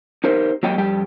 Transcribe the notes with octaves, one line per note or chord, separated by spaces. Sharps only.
D#4 G4 A#4 C5
F#3 A#3 G4 D#5 G5
F2 G3 G4 G5